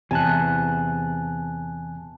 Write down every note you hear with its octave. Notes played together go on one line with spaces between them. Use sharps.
E2 C3 G#5 A5 F#6